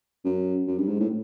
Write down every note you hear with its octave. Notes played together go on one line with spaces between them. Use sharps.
F#2
F#2
G2
G#2
A2